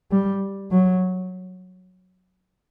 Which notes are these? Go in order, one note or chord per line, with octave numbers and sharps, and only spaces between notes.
G3
F#3